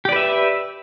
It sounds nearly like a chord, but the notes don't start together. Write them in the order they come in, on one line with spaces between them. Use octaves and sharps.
G4 D5 B4 E5